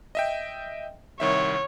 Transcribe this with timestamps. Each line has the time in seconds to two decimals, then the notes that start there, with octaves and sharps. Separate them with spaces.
0.15 D#5 E5 G5
1.20 C2 D#3 C#5 E5